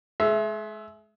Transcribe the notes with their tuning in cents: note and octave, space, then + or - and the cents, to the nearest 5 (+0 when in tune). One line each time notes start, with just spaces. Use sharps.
G#3 +35 E5 +0